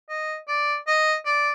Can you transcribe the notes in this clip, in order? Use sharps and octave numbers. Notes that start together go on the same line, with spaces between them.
D#5
D5
D#5
D5